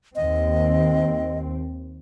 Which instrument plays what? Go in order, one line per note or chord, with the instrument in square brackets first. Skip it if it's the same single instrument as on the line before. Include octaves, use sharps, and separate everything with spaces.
[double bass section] D#2 C4 [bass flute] D#5